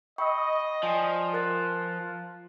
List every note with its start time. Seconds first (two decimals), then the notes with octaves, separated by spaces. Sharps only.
0.18 D#5 G5 B5 C#6
0.83 F3 D5 G5 G#5
1.33 F4 A#4 F#6 A6